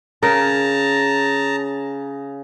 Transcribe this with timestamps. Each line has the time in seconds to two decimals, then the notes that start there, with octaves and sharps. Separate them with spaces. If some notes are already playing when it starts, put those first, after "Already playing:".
0.23 C#3 A#4 A5 A#5